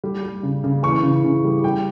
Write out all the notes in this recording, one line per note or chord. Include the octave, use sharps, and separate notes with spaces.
G3
G3
C#3
C#3
E3 C#6
C#3
C#3
G3
G3 G5